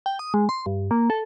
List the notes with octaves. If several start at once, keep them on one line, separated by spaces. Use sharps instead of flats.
G5
D#6
G#3
C6
G2
A#3
A4